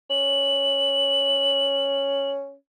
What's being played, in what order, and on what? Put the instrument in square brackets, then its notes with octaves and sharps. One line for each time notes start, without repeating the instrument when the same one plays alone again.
[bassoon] C#4 [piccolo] F#7